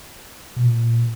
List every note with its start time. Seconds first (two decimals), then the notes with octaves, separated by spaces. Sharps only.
0.56 B2
0.64 A#2